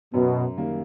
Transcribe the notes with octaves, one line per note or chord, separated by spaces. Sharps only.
F#2 B2
D#3 G3 A#3